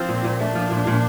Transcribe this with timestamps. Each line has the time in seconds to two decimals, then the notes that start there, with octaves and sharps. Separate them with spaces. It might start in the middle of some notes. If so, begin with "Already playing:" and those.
Already playing: F3 C4
0.09 A#2
0.24 A#2
0.40 A3 D4
0.55 F3
0.71 A#2
0.87 A#2